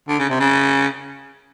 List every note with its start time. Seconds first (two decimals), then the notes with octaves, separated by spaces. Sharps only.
0.09 D3
0.19 C#3
0.30 C3
0.40 C#3